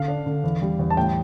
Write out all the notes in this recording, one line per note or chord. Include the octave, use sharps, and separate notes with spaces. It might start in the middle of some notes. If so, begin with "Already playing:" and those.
Already playing: D3 F5
D4
D3
E2
G3
E2
A5
A2 G5